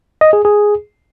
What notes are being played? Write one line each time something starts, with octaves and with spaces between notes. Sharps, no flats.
D#5
G#4
G#4